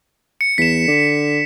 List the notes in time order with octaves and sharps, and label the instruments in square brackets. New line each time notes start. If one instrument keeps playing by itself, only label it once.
[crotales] C#7
[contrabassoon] E2 [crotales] B6 E7
[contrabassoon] D3